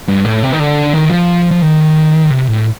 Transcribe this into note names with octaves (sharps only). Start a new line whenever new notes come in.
G2
A2
C3
D#3
D3
D#3
F3
F3
D#3
C3
A2